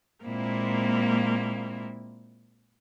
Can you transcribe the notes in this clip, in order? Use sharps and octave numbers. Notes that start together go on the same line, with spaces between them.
A#2 G#3 A#3 C4 E4